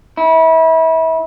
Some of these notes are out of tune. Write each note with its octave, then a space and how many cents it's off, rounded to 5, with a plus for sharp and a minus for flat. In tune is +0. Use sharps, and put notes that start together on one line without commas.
E4 -30